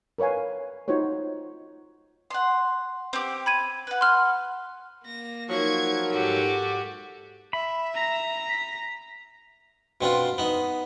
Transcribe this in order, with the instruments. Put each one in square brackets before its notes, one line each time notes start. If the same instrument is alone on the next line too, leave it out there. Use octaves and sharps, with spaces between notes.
[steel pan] A#4 B4 C#5 F5 G#5
D#4 F4 F#4 C5 C#5
[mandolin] F#5 C6
C4 G4
[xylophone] B5 G#6 D#7
[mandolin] B4 F#5
[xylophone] C6 F6
[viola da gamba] A#3 [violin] A#6
[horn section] F3 F#3 [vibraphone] D#4 A#4 [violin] C#6 G#6
[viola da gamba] G#2 G4 A4 [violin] F#4
[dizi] E5 [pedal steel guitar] B5
[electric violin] A#5 A#6
[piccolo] B6
[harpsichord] B2 C4 D4 F4
B3 D#4